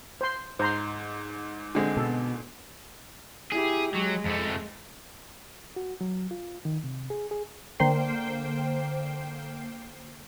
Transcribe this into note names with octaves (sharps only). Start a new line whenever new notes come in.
C5 C6
G#2 C5 A#5 C6
D3 G#3 C4
B2 A4
E4 G4 G#4
F#3 G#3
F2 A3
F#4
F#3
F4
D#3
C3
G#4
G#4
D3 A#3 C5 G5 C7